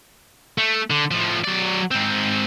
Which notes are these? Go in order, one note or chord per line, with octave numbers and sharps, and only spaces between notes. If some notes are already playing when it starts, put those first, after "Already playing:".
A3
D3
A2 F3
F#3 D5
G#2 C4